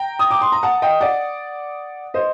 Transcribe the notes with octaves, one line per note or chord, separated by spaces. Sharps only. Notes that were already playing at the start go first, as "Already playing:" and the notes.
Already playing: G5 A#5
D#6
D6
C6
A#5
F#5 A5
D#5 G5
D5 F#5
C5 D#5